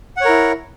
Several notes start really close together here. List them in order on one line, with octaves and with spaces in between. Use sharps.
F#5 C#5 A#4 E4